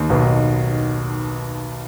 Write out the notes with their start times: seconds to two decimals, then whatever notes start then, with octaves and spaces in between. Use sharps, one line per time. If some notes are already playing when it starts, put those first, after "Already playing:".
Already playing: D#2 D#3
0.10 B1 B2